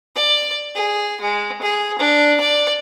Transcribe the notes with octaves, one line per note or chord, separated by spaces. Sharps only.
D5
G#4
G#3
G#4
D4
D5